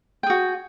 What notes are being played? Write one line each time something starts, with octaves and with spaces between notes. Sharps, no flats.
F#4 G#4 G5